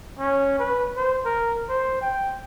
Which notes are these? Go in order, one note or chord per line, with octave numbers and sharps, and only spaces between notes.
C#4
B4
C5
A#4
C5
G5